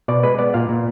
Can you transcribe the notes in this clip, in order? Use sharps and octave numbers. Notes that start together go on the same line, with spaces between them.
B2 D5
G#3 B4
B3 D5
A#2 F5
A#2